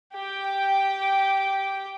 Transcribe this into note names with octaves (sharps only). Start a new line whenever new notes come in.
G4 G5